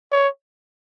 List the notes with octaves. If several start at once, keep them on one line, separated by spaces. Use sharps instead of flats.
C#5